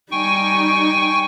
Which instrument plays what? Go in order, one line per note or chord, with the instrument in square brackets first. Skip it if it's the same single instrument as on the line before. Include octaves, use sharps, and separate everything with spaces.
[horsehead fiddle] G3 D#4 [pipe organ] G5 G#5 C#6